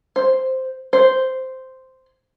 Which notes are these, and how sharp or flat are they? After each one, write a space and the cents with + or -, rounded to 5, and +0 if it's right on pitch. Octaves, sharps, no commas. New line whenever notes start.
C5 +0
C5 -5